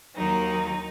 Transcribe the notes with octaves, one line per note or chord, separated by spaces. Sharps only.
D#2 D#3 F#3 D#4